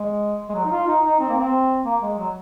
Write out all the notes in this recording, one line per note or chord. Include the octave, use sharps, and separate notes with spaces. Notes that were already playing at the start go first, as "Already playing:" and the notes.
Already playing: G#3
G#3
F#3
D#4
F4
D#4
D#4
C4
A#3
C4
A#3
G#3
F#3